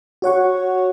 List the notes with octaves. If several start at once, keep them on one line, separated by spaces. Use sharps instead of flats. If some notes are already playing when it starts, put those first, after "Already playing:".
F#4 C#5 F#5 C#6